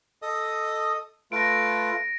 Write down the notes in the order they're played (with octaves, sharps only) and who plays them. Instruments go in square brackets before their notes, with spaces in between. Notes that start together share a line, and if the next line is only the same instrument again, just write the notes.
[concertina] A4 D#5 D#6
[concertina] A3 F4 B4 [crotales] A#6 D7